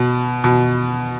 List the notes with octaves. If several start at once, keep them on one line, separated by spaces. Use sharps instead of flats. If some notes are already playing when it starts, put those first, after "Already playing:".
Already playing: B2
B2